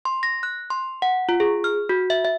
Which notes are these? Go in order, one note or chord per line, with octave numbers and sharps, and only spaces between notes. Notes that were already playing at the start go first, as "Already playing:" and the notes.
C6
A#6
F#6
C6
F#5
F4
G#4
F6
F#4
E5
E5